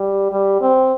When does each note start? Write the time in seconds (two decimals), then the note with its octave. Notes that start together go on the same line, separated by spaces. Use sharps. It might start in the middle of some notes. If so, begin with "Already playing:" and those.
Already playing: G3
0.32 G3
0.61 C4